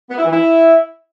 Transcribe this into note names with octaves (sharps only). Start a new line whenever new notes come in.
B3
E4
E3
E4